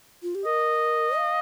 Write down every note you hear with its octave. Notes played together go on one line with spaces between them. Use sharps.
F4
G4
A#4 D#5
F5